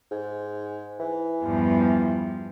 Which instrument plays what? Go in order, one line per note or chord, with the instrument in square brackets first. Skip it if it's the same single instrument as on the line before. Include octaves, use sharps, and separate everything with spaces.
[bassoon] G#2
E3
[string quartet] E2 G2 F3